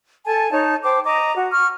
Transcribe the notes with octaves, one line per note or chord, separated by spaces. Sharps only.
A4 G#5 A5
D#4 C#5 A5
C5 G5 A5 D6
D#5 A#5 D6
F#4
C#6 F6